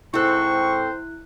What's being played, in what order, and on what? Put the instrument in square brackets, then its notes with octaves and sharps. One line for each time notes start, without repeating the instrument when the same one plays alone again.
[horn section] G#2 C5 [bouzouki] C4 A4 [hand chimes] E4 F#6 [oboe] C#6